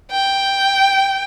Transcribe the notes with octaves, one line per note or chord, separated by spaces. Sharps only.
G5